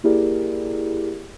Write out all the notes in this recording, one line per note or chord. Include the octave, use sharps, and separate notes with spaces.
A#3 E4 G4 G#4 A#4 D5